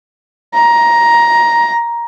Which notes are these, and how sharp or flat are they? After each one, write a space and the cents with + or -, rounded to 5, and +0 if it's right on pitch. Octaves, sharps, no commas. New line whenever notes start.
A#5 +10